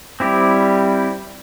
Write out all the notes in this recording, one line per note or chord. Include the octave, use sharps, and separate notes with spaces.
G3 C4 E4 G4